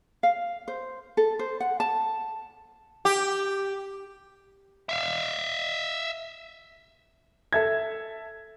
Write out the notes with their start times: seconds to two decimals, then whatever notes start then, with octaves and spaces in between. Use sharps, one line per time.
0.23 F5
0.68 C5
1.17 A4
1.39 C5
1.60 F#5
1.80 A5
3.05 G4
4.89 E5 F5
7.53 A4 E5 G#6